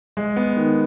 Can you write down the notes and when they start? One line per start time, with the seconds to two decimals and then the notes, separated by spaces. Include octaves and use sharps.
0.17 G#3
0.36 B3
0.57 D#3